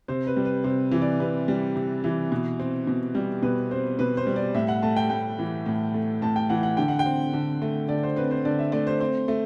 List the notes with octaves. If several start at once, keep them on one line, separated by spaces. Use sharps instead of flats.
C3 C5
B4
G3
B4
C3 C5
E3
D5
C3 B4
G3
C3
E3
B2
C4
B2
G3
B2 B4
C4 C5
B2 B4
C5
G3
D5
A2 E5
F#5
A3 A5
G5
A2 G5
E3
A2
A3
A2 A5
G5
E3 F#5
F#5
D3 G5
F#5
G5
C4
D3
A3
D3 D5
C5
C4 B4
C5
D3 D5
E5
A3 D5
C5
C4 C5
A3